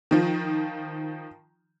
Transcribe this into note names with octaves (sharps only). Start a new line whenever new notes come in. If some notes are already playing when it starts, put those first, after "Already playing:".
D#3 F3